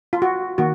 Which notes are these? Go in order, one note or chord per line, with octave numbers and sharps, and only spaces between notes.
F4
F#4
D#3 A#3 F#4